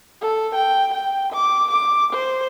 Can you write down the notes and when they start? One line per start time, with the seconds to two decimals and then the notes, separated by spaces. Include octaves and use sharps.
0.21 A4
0.55 G5
0.94 G5
1.33 D6
1.71 D6
2.13 C5